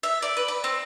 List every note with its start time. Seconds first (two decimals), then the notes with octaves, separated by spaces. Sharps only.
0.03 E5
0.22 D5
0.37 B4
0.48 B5
0.64 C4